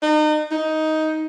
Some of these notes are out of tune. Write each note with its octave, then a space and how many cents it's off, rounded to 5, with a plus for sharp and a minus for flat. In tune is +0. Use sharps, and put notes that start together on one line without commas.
D#4 -35
D#4 +10